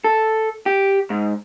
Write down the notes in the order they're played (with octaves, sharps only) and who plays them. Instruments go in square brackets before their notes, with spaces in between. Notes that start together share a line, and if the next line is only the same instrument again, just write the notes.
[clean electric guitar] A4
G4
G#2